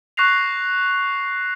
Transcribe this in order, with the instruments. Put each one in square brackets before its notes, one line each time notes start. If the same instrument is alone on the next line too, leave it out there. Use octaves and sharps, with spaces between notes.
[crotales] C#6 F#6 A#6 C7 F7